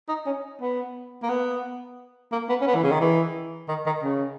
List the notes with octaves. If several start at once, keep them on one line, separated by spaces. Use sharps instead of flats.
D#4
C#4
B3
A#3
B3
A#3
B3
C#4
B3
E3
C#3
D#3
E3
D#3
D#3
C#3